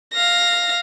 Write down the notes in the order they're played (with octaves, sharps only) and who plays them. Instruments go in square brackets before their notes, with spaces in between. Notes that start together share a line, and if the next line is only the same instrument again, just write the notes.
[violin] F5 A#6